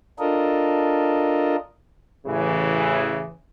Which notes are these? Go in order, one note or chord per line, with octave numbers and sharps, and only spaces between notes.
D4 F4 A4 A#4 D#5
A1 C#3 E3